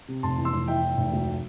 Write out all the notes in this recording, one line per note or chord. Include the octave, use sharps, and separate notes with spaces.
C3
F1 A5 C6
E2
C6 E6
F1
E3 E5 G5
E2
F1
D2